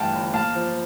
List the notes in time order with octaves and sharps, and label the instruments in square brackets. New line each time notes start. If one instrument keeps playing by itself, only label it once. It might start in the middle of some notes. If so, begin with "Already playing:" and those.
Already playing: [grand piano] G2 E3 A3 F5 G5 A5
G1
A#3 F5 A5
F3